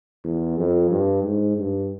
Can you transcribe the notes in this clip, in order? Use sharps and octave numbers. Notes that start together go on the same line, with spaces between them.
E2
F2
G2
G#2
G2